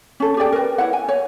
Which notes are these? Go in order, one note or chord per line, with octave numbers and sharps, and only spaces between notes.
C#4 A4
G4 G#4 D5 G5
A#4 B4
E4 B4 C#5 F#5
G#5
C#5